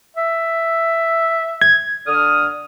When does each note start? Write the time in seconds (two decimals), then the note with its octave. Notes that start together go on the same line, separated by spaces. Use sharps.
0.17 E5
1.62 G#6
2.07 D3 D#6 F6